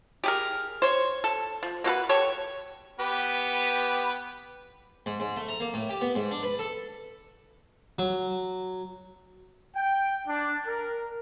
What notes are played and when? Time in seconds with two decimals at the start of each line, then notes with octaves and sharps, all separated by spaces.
0.24 G4 G#4 A#4
0.82 C5 C#5
1.24 A4
1.63 F3
1.84 A#3 F#4 A4 B4
2.09 G4 A4 C#5
3.00 B3 G4 B4
5.06 G#2
5.20 G#2
5.37 A3
5.49 A#5
5.60 A#3
5.74 A2
5.89 G4
6.01 B3
6.15 G#2
6.31 D4
6.43 B4
6.59 A4
7.99 F#3
9.76 G5
10.28 D4
10.67 A#4